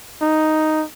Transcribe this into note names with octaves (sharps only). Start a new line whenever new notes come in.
D#4